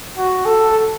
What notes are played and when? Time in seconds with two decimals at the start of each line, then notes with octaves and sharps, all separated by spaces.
0.17 F#4
0.45 A4